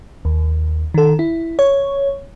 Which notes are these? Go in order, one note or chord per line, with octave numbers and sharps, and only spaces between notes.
D#2
D#3 A4
E4
C#5